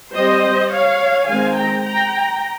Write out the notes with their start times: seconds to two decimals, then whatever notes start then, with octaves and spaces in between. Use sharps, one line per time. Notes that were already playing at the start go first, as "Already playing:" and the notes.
0.13 G3 C4 C5 D#5
0.70 C#5 F5
1.26 D#3 G#3 C4 F5 G#5
1.54 G5 A#5
1.83 G5 A#5